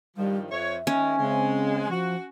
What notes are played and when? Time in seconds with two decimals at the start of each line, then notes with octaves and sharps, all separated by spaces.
0.17 G2 D#3 F3 G3
0.49 F2 C#5 E5
0.87 D#3 G#3 C#4
1.18 C#3 G#3 C4
1.88 F3 F#4